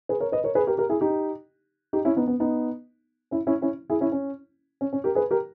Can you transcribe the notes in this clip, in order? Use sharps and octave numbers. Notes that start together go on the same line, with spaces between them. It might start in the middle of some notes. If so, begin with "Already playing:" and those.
G#4 B4
A#4 C#5
B4 D#5
A#4 C#5
G#4 B4
G4 A#4
G4 A#4
E4 G#4
D#4 G4
D#4 G4
C#4 E4
B3 D#4
B3
B3 D#4
C#4 E4
C#4 E4
C#4 E4
E4 G#4
C#4 E4
C#4
C#4
C#4
G4 A#4
G#4 B4
G4 A#4